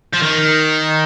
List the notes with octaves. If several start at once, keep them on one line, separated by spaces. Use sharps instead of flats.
F3
D#3